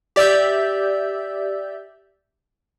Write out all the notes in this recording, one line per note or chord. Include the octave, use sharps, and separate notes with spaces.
G4 D5 E5 E6 G6